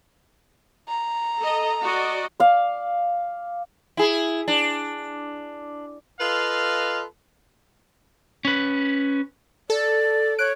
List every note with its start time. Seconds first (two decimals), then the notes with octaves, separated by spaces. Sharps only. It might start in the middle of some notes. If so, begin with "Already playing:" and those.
0.88 A#5
1.39 A4 D#5
1.82 F#4 D5 D#5
2.40 D5 F5
3.97 E4 G#4
4.48 D4
6.20 F4 A4 B4 D#5 F5
8.45 C#4 B4
9.70 A4 D5
10.38 C#5 F#6 D7